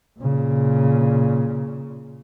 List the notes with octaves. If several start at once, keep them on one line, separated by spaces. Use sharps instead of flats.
A#2 C#3